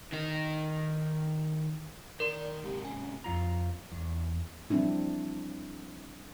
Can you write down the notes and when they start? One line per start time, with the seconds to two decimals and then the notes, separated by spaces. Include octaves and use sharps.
0.12 D#3 D#4
2.20 D#3 A#4 D5 C6
2.63 G#2 C3 G4
2.85 C#4 G#5
3.24 F2 F4 A#5
3.92 E2
4.70 F3 G3 C4 D4 E4